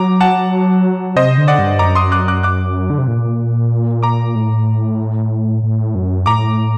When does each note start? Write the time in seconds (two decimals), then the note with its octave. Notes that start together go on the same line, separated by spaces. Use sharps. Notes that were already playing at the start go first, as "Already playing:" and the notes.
Already playing: F#3 A#5 D6
0.21 F#5 A5
1.16 C3 C5 D#5
1.38 D3
1.48 D5 F#5
1.59 G2
1.79 F#2 A#5 D6
1.95 C6 D#6
2.12 D6 F#6
2.28 D6 F#6
2.43 D6 F#6
2.90 D3
2.98 C3
3.08 A#2
4.03 A#5 D6
4.35 A2
5.63 A2
5.95 F#2
6.26 A2 A#5 D6